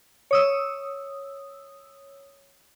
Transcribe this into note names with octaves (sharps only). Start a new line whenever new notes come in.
C#5 D#6 E6